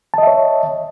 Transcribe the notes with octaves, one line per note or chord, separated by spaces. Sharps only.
C#5 D#5 E5 A5